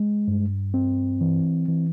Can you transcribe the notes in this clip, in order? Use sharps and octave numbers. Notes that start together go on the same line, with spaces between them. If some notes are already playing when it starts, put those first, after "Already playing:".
Already playing: G#3
G2
C4
E3
E3